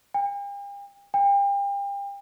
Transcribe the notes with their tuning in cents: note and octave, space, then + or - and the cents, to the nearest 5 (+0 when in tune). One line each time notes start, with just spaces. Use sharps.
G5 +45
G5 +35